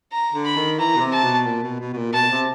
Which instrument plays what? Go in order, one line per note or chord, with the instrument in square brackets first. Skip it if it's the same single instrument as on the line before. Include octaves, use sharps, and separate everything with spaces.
[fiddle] A#5
[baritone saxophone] D3
[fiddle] B5
[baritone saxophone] D#3
[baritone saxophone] E3 [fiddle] A#5
[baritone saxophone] B2
C3
[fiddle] A5
[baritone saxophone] B2
A#2
B2
B2
B2
A#2
[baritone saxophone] B2 [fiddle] A5
[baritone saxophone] C3